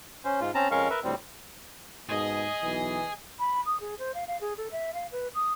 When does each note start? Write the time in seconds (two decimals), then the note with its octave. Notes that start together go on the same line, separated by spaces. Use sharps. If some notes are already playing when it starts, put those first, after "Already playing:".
0.25 C#4 C5
0.41 G#2 F4
0.55 C4 C#4 A5 A#5
0.71 F2 G#3 C#4 A#4 F5 C#6
0.90 A#4 B4 E5
1.04 D2 A2 G3 C4
2.09 G#2 B2 G#4 D#5
2.63 B1 E3
3.39 B5
3.66 D#6
3.80 G#4
3.99 C5
4.14 F5
4.28 F5
4.41 G#4
4.57 A4
4.72 E5
4.94 F5
5.12 B4
5.35 D#6